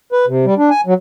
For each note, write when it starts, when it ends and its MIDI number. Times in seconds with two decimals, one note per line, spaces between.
0.12 0.26 71
0.27 0.45 48
0.45 0.54 55
0.58 0.70 62
0.70 0.81 80
0.86 0.94 54